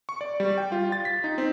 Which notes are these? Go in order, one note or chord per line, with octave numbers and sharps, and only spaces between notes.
C#6
D5
G3
G5
F4
A6
B6
D#4
C4